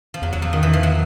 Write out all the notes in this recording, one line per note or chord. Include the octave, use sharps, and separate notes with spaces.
F3
E2 F#3
F#3
F3
D#3
E3
F3
F#3